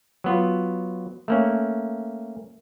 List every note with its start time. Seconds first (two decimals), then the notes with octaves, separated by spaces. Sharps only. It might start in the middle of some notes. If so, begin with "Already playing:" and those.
0.24 F#3 B3 F4
1.28 A3 A#3 C#4